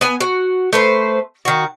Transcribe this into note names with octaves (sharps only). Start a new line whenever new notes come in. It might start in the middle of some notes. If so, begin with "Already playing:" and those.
B3 G#5
F#4
A3 B4 C5
D#3 F#4